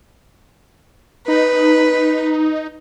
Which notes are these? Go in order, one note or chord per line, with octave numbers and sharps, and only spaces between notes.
D#4 B4